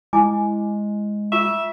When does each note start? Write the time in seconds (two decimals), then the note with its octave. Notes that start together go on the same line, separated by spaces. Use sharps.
0.13 G#3 E4 G#5 D6
1.32 F4 E5 C#6